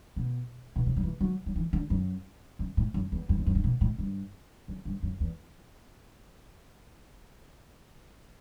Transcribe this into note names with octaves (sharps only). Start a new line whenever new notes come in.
B2
B2
C3
F#3
E3
F#3
F#3
E3
D3
F#2
F#2
A2
F#2
E2
F#2
E2
F#2
G2
B2
A2
G2
F#2
G2
F#2
E2